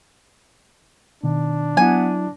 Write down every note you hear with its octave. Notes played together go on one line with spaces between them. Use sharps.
B2 D#3 D4
F#3 B3 E4 G#5